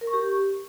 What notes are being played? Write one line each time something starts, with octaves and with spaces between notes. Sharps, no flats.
A#4
C#6
G4